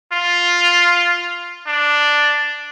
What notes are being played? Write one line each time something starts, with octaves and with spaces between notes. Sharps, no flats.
F4
D4